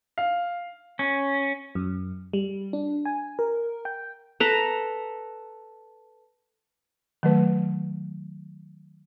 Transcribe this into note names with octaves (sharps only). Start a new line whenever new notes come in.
F5
C#4
F#2
G3
D4
G#5
A#4
G5
A4 B4 A#5
D#3 F#3 A3 B4